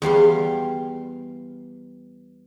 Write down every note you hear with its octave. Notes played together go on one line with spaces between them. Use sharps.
E2 G3 F5 C6